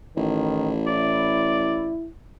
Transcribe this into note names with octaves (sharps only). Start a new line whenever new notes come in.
A1 D#3 E4
E4 D5